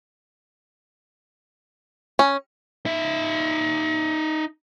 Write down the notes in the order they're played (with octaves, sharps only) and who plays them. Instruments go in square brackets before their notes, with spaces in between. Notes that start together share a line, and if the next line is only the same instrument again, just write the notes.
[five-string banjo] C#4
[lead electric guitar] D#4 E5